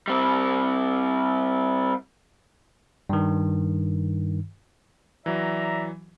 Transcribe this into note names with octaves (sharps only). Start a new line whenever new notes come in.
G3 C4
G2 D#3
E3 F#3 D5 E5 A#5